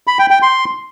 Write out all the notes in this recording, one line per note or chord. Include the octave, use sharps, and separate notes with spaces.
B5
G5
G5
C6